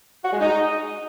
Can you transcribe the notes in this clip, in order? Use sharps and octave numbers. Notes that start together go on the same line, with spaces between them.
F#4
G#3
D#4